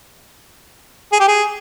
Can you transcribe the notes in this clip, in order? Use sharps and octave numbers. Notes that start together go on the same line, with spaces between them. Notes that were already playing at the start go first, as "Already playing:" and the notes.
G#4
G4
G#4